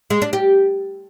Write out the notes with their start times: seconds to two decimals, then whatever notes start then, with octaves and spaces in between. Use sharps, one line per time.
0.10 G#3
0.22 D4
0.33 G4